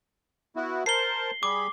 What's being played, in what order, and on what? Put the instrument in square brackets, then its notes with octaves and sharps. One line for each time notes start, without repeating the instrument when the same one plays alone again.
[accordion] B3 E4 F#4
[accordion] A#4 C5 A5 [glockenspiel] C7 G7
[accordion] G3 G#4 B5 [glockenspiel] D6